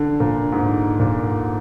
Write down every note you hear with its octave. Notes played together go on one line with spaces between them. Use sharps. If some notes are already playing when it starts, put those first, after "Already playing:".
Already playing: D3
A#2
G#2
A#2